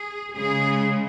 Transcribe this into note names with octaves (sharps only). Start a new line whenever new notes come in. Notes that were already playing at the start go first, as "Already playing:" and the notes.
Already playing: G#4
C#3 G#3 G#4